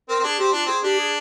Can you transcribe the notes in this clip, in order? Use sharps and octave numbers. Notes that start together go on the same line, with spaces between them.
C4 A#4
C4
D4 G#4
C4 G4
D4 F4
C4 G#4
D4 G4
G#4